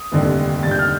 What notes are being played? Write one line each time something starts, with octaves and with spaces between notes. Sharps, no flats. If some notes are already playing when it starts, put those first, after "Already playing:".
Already playing: D#6
F1 D#2 D3 G3
F1 D#2 D3 G3 A6
G6
F6